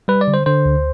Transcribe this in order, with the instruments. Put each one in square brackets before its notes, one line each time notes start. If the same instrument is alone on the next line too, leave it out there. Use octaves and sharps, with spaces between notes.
[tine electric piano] G3 B4
D5
D3
C5
D3 C5
D2